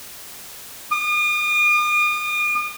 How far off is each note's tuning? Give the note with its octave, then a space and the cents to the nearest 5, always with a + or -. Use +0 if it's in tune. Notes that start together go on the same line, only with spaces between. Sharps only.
D#6 -40